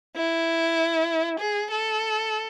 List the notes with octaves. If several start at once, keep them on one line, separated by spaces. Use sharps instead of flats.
E4
G#4
A4